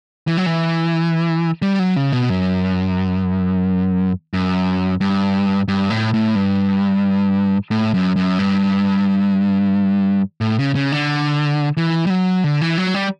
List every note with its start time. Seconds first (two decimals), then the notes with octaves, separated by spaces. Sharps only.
0.27 E3
0.37 F#3
0.46 E3
1.62 G3
1.79 F#3
1.96 C#3
2.13 B2
2.30 F#2
4.34 F#2
5.01 G2
5.68 G2
5.90 A2
6.14 A2
6.36 G2
7.71 A2
7.94 F#2
8.16 F#2
8.39 G2
10.41 A2
10.59 C#3
10.75 C#3
10.92 D3
11.77 E3
12.06 G3
12.10 F#3
12.44 D3
12.61 E3
12.78 F#3
12.94 G3